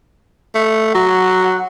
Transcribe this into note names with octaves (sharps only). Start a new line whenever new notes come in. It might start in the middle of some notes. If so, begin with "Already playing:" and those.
A3
F#3 F#5